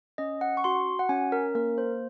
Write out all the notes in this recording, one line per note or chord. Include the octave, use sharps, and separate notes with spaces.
C#4 D#5
F#5
C#6
F#4 C6
F#5
C#4 G#5
A#4
A#3 A#4
C5